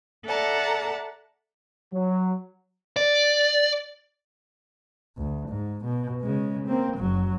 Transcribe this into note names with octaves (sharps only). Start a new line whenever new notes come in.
A4 D5 E5 F#5 A5 A#5
F#3
D5
D2
G#2
B2
C#3 G#3
A#3 C4
F#1 F#3